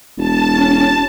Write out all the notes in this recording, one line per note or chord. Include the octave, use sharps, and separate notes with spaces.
E1 A5
C#4